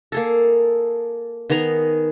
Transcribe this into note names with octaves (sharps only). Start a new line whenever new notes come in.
A#3 G#4 A4
D#3 B3 G#4 A#5